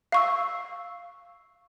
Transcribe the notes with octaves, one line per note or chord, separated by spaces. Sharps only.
F5 C#6 E6